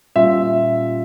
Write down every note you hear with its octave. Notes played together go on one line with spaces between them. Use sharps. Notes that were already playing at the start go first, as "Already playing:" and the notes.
A#2 G3 C#4 F4 E5